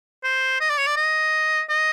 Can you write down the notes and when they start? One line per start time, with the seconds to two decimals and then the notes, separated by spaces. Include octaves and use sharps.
0.24 C5
0.61 D#5
0.70 D5
0.78 C#5
0.87 D5
0.96 D#5
1.70 D#5